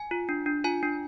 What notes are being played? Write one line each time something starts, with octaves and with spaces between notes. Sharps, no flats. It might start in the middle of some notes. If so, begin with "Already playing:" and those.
Already playing: G#5
F4
D4
D4
F4 G#5
D4